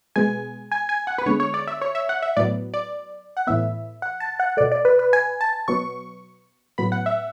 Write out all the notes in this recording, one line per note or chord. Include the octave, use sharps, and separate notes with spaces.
B2 G#3 B3 G#5
G#5
G#5
F#5
B4
D3 G#3 B3 C#5
C#5
D5
E5
C#5
E5
F#5
E5
A2 F#3 B3 D5
D5
F#5
A2 E3 B3 E5
F#5
A5
F#5
B2 A3 D5
D5
B4
B4
G#5
A5
B2 F#3 B3 C#6
A2 F#3 B3 B5
F#5
E5